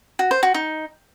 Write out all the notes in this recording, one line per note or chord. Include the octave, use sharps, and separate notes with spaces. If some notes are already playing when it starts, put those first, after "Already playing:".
F#4
C5
F#4
D#4